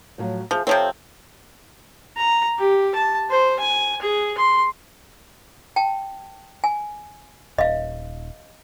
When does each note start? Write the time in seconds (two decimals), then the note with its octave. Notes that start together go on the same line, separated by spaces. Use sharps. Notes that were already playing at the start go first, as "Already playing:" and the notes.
0.18 A2 F3 F#3
0.51 F3 G#4 E5
0.67 C3 F3 C4 A4 C#5
2.16 A#5
2.59 G4
2.94 A5
3.30 C5
3.60 G#5
4.01 G#4
4.37 C6
5.76 G5 A5
6.64 G#5
7.58 D#1 D#5 F5